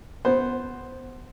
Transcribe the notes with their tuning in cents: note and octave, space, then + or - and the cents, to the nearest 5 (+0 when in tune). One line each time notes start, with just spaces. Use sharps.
B3 +5 C5 +0